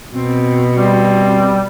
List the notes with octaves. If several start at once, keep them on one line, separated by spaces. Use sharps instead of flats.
B2 C4
G3 C4